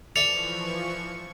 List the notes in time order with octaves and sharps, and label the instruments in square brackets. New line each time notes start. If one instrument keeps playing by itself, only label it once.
[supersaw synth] E3 F3 C#6 [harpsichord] A4 D5 E5 [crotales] C#7 [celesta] F7